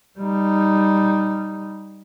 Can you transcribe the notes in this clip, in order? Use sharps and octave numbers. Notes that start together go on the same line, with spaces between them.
G3 D#4